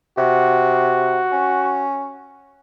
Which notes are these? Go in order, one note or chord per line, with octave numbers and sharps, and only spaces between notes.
C3 F#4
C#4